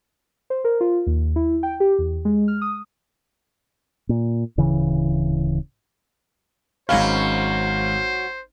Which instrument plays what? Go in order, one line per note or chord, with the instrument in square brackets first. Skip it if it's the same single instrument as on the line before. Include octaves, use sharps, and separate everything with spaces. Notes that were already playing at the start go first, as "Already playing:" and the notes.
[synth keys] C5
A#4
F4
D#2
E4
G5
G4
E2
G#3
F6
D#6
[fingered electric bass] A#2
D1 C#3 E3
[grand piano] G#1 B5 [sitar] F#3 C#4 [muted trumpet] C5 [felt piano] F5